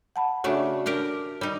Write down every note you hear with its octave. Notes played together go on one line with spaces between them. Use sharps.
F#5 A5 B5
C#3 A3 D4 F#4 D5 E5
D4 G4 A#4
G3 D#4